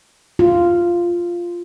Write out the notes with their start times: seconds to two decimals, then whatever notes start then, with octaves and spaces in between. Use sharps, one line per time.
0.39 F4